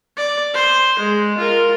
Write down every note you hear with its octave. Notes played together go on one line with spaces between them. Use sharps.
D5
C5
G#3
F4 A#4